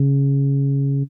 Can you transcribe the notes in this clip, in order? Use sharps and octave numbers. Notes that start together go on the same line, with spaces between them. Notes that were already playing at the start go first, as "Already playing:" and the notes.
Already playing: C#3